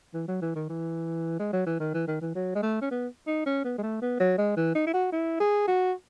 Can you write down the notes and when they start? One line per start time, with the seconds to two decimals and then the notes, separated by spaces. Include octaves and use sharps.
0.14 E3
0.28 F#3
0.42 E3
0.55 D#3
0.69 E3
1.40 G#3
1.53 F#3
1.66 E3
1.80 D#3
1.94 E3
2.07 D#3
2.21 E3
2.35 F#3
2.55 G#3
2.63 A3
2.82 C#4
2.91 B3
3.27 D#4
3.46 C#4
3.64 B3
3.78 G#3
3.83 A3
4.02 B3
4.20 F#3
4.38 G#3
4.57 E3
4.75 D#4
4.87 E4
4.94 F#4
5.12 E4
5.40 G#4
5.67 F#4